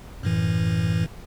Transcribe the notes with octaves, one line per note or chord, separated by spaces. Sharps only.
F#2 A2 E3